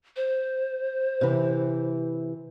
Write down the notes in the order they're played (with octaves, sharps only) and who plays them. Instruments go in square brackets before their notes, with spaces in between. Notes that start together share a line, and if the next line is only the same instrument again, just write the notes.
[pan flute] C5
[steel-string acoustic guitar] C3 E3